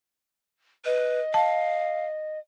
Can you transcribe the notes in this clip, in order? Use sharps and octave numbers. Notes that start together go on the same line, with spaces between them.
B4 D#5
F5 A5